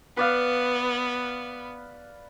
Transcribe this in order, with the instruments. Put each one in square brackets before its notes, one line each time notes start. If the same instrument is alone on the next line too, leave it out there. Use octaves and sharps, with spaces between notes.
[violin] B3 [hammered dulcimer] B4 D5 F5